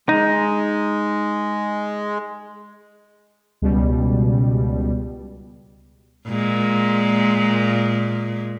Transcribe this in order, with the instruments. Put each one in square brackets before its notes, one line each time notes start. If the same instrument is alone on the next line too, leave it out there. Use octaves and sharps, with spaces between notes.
[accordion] G#3 [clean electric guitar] D#4
[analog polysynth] C#2 B2 G3
[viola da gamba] A#2 G#3